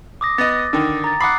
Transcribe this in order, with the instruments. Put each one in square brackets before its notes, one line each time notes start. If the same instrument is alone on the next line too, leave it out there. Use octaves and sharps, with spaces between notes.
[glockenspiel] D6 D#6 A#6
[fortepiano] B3 D#5 [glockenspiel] A6
[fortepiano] D3 D#3
[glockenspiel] A#5 A6
[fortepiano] F#5 B5 [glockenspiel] D6 D#6 C7